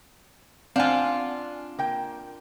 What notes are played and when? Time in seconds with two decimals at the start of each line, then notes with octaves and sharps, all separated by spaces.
0.76 C4 D4 F4 F5 F#5 G#5
1.79 A#3 G5